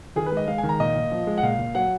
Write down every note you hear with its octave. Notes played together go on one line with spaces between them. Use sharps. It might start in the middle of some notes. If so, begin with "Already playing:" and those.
D#3 G#4
B4
G#3
D#5
G#3 F5
G#5
D#3
A#5
A#2 D#5
A#2
F3
G#3
F#5
A#2 F5
A#2
F#3 F#5